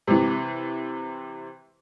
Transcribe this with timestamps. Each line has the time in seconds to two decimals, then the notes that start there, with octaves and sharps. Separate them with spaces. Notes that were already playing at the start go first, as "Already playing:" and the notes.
0.07 C3 E3